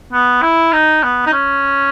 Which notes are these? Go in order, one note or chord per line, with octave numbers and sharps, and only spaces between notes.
B3
E4
D#4
B3
D#4
C#4